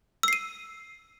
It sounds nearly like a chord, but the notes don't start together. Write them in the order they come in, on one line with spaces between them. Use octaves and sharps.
E6 C7 D#7